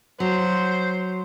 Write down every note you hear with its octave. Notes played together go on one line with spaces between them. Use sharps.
F#3 C5